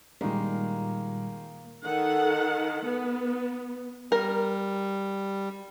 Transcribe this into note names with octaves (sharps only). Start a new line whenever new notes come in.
A#2 D#3 G3 G#3 A#3
D#3 A4 F#5
B3
G3 A#4